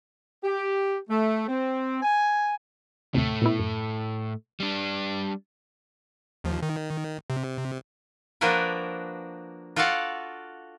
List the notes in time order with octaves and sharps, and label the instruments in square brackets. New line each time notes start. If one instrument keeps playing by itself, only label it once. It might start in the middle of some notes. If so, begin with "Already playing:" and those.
[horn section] G4
A3
C4
G#5
[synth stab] D#2 C3 [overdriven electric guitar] A2 A3
[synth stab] A#2 B3 E4
F#2
[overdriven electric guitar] G3 D4
[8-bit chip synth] D#2 F3
D#3
C3
[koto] F3 A#3 D4 F#4 A#4 B4
F4 F#4 A4 D5 F5 F#5